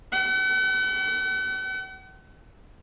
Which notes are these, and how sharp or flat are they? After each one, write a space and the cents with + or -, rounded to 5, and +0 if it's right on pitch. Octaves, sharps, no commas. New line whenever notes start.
F#5 +45